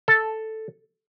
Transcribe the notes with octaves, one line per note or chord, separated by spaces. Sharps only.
A4